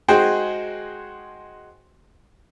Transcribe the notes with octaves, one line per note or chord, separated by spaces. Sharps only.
G#3 D#4 F#4 G#4 C5 G5